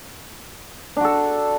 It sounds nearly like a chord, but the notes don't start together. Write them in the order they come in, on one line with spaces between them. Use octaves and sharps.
D4 F#4 A4